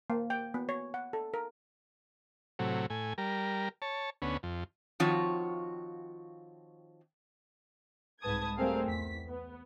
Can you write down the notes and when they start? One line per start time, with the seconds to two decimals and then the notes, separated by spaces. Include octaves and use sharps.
0.10 A#3
0.30 G5
0.54 B3
0.69 C#5
0.94 F#5
1.13 A4
1.34 A#4
2.59 A2 C3 F#3
2.90 A2 G#5
3.18 G3 A#4
3.82 C#5 A5
4.22 D2 B3 C#4
4.43 F2
5.00 D#3 F3 C4 F4 F#4 C#5
8.21 C2 G#2 B4 A5 D#6 G#6
8.57 G3 A3 C4 G#4 A#4 F5
8.87 E2 B6
9.28 B3